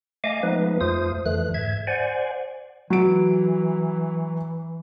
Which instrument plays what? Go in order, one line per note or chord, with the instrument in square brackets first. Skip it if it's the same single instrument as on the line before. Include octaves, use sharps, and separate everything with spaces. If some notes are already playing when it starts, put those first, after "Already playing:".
[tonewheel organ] A3 D#5 F5 G#5 D6
F3 G#3 A3 B3 D#4 B4
F2 A3 F4 C5 D#6
F2 D3 E3 A3 F#6
G#2 E5 G#6
C5 D5 F#5 G#5
[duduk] E3 [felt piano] F#3 D7